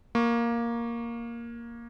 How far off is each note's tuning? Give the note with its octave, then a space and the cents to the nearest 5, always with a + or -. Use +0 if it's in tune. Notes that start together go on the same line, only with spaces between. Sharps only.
A#3 +5 C#6 +0